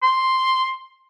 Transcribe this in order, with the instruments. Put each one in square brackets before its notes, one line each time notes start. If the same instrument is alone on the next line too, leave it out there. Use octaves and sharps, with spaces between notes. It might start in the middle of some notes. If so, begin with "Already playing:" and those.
[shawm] C6